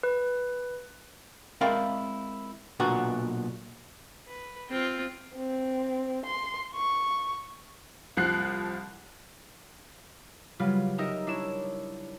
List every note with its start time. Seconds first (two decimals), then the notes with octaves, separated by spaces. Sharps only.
0.03 B4
1.61 G#3 C4 E4 A#4 D5 F5
2.80 B1 A#2 B3 D4 F#4
4.27 B4
4.70 C4 F4
5.36 C4
6.26 C6
6.76 C#6
8.17 C2 F3 F#6 C7
10.59 C#3 F#3 G3 F4 B4
10.98 D#4 G4 A#4 D#5 E5
11.27 D4 E4 C#5 E7